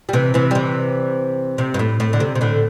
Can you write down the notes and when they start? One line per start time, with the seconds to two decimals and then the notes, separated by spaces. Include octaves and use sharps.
0.09 G3
0.13 C3 E3
0.34 C3 E3
0.51 G3
0.55 C3 E3
1.58 C3
1.74 G2
1.79 A2
2.00 A2
2.13 D3
2.20 C3
2.35 C3
2.41 A2 D3